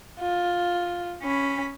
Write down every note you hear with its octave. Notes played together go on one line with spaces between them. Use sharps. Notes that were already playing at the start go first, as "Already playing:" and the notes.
F4
C#4 B5